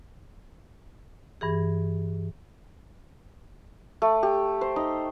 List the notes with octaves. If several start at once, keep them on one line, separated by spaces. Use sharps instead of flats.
G2 E3 G#4
A3
G4
C5
D#4